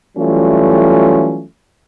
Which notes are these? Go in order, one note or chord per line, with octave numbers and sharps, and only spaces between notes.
E3 F#3 G3 A3 C#4 F4